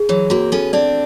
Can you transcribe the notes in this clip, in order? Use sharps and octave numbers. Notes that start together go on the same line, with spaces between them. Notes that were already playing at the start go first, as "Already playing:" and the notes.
Already playing: G#4
E3 F#3 C#5
A#3 C4 F#4
B3 C#4 A4
C4 D4 D5